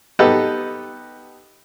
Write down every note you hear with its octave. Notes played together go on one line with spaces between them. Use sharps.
B3 D#4 G4 A4 B4 D#5